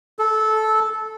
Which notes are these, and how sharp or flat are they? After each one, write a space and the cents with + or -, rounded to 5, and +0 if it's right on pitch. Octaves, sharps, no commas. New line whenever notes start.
A4 -15